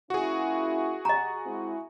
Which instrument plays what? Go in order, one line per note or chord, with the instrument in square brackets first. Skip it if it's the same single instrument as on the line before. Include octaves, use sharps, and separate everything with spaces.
[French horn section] A#2 C#4 E4 [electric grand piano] F#4 G#4
[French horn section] G4 [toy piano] D#5 A#5
[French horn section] G#3 C4 E4